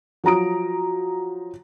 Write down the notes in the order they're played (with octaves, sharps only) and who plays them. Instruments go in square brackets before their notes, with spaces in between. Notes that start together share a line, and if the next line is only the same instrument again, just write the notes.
[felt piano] F3 F#3 A#5 D#6 D7